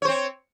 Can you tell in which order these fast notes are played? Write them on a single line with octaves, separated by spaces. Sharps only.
C#5 C5 C4